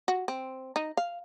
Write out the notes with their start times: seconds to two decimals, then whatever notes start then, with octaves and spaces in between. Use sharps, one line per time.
0.08 F#4
0.28 C4
0.76 D#4
0.97 F5